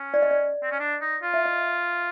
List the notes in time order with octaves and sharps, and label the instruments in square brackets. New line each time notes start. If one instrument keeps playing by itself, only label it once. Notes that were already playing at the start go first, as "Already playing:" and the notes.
Already playing: [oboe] C#4
[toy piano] D5
D#5
D5
[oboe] C4
C#4
D4
D#4
F4
[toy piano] E5
D#5